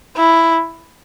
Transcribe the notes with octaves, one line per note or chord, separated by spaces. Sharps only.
E4